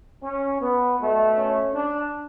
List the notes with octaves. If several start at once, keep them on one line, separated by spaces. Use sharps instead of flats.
C#4
B3
B2 A3
C#4
D4